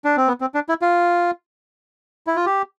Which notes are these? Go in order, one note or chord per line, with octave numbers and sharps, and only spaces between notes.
D4
C4
B3
C4
D4
E4
F4
E4
F4
G4